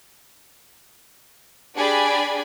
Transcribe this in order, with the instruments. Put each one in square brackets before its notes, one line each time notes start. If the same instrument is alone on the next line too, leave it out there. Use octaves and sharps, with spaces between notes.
[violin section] D4 G4 G#4 D5 G#5 B5